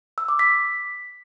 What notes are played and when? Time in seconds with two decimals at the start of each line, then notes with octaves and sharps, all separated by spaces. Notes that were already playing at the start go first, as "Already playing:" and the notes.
0.18 E6
0.29 D6
0.39 B6